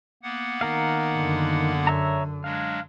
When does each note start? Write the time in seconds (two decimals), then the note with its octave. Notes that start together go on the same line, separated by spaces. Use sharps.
0.23 A#3 B3 F#5
0.61 D#3 A#4 F5
1.14 F#2 D3
1.87 C#5 E5 A#5
2.44 F#3 G#3 D4 F5